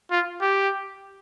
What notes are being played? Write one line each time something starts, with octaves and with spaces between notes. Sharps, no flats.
F4
G4